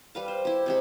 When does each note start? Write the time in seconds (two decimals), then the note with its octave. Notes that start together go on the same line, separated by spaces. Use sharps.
0.15 G3 B4 F5
0.28 C5
0.45 E4 G4
0.66 C3 G#3 G4